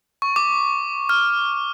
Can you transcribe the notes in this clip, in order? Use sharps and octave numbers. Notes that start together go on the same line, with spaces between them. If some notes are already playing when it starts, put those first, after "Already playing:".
C#6
D6
F6